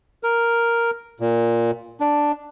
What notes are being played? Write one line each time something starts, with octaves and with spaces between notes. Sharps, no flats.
A#4
A#2
D4